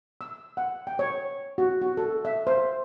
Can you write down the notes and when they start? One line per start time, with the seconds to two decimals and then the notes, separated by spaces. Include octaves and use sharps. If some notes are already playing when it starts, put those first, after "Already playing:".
0.21 E6
0.57 F#5
0.87 G5
0.99 C#5
1.58 F#4
1.81 F#4
1.97 A4
2.25 E5
2.47 C5